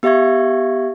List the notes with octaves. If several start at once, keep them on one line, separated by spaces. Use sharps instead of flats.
B3 G4 E5 F5 C#6 G#6